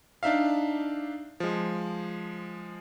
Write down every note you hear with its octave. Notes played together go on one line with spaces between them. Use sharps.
D4 D#4 E5 F5
F3 G#3